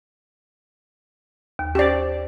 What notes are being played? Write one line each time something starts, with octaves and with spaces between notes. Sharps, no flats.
D#2
C#4 G4 C5 D5